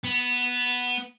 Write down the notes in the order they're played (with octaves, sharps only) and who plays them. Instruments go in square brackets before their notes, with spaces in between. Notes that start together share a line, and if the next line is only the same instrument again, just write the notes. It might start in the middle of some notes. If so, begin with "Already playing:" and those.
[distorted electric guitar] B3